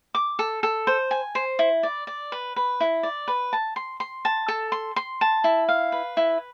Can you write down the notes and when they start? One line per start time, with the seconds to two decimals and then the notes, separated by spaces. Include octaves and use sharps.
0.15 D6
0.39 A4
0.63 A4
0.87 C5
1.11 G#5
1.35 C5
1.59 E4
1.83 D5
2.07 D5
2.32 B4
2.56 B4
2.80 E4
3.03 D5
3.28 B4
3.53 A5
3.76 C6
4.00 C6
4.25 A5
4.48 A4
4.72 C6
4.96 C6
5.21 A5
5.44 E4
5.69 F5
5.92 B4
6.17 E4